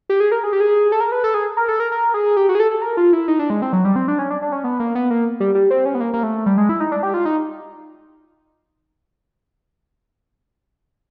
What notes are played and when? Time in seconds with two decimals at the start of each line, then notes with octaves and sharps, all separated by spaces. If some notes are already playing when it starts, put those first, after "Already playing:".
0.09 G4
0.20 G#4
0.32 A#4
0.44 G#4
0.53 G4
0.60 G#4
0.92 A4
1.01 A#4
1.12 B4
1.24 A4
1.34 G#4
1.57 A#4
1.68 A4
1.80 A#4
1.92 A#4
2.14 G#4
2.37 G4
2.49 F#4
2.55 G#4
2.60 A4
2.71 A4
2.82 A#4
2.97 F4
3.13 E4
3.28 D#4
3.39 D4
3.50 G#3
3.62 C4
3.73 F#3
3.85 G3
3.96 C4
4.08 D4
4.19 C#4
4.30 D4
4.42 D4
4.52 C#4
4.64 B3
4.80 A#3
4.95 B3
5.10 A#3
5.40 G3
5.55 G3
5.71 C4
5.85 C#4
5.95 B3
6.00 A#3
6.13 A#3
6.23 A3
6.46 G3
6.58 G#3
6.69 E4
6.80 D#4
6.92 D4
7.03 G4
7.14 F4
7.25 D#4